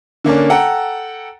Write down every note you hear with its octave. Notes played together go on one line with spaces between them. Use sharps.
D3 A#3 C#4 D4
A4 F#5 G5 A#5